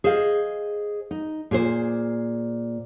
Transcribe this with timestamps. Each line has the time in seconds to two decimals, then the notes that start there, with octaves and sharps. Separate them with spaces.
0.04 G#4 C5 D#5 F5
1.11 D#4
1.51 A#2 G#4 C5